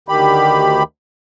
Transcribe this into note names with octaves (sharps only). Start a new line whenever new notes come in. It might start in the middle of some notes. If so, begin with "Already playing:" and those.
D2 D#3 G4 B5